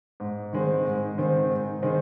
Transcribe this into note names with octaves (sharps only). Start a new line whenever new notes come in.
G#2
D#3 G#3 C4
G#2
D#3 G#3 C4
G#2
D#3 G#3 C4